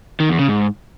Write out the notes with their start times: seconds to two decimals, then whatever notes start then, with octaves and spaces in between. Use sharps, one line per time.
0.20 D#3
0.29 E2
0.39 C#3
0.48 G#2